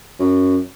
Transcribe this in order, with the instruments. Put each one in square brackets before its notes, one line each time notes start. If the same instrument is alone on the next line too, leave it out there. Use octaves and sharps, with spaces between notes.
[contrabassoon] F#2